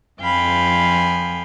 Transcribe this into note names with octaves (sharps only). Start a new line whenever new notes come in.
F2 F3 F5 G5 G#5 B5